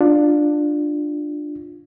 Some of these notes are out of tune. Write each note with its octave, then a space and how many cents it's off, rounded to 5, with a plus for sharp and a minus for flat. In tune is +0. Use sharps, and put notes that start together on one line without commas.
D4 +15 F4 +10